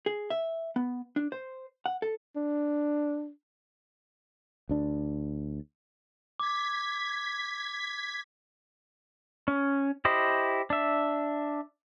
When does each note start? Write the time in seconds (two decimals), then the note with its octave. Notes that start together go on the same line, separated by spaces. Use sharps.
0.06 G#4
0.30 E5
0.76 B3
1.16 D4
1.32 C5
1.86 F#5
2.02 A4
2.36 D4
4.69 D2 D4
6.40 D6 G#6 B6
9.48 C#4
10.05 E4 G4 C5 D#5
10.70 D4 E5